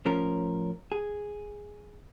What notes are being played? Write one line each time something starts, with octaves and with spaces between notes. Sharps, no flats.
A2 F3 C#4 A#4
G#4